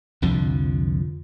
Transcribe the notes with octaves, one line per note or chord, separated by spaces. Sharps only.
C2 F2 D3 F3